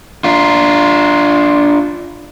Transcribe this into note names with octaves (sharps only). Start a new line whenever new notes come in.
D4 F4